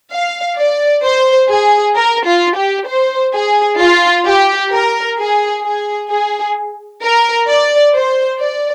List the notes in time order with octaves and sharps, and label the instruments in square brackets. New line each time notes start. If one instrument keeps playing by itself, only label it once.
[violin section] F5
D5
C5
G#4
A#4
F4
G4
C5
G#4
F4
G4
A#4
G#4
G#4
G#4
A#4
D5
C5
D5